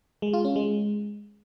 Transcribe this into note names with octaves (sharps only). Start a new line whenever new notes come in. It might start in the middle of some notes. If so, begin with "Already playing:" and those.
G#3
F4
C#4
G#3